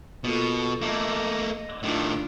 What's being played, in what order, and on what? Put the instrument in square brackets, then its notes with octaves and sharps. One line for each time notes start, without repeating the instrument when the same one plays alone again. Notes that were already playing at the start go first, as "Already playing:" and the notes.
[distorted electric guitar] B2 [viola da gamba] A#3 F4 A4
[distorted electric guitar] A3 A#3 [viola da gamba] D#5
[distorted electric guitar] A2 D#3 [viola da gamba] D4 F4